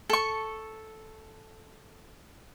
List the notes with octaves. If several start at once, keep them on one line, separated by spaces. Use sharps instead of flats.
A4 C#6